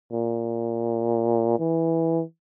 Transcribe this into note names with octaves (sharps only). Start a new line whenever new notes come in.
A#2
E3